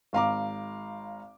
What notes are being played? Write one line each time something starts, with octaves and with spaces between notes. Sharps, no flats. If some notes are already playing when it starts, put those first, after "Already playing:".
G#1 F5 A#5 D6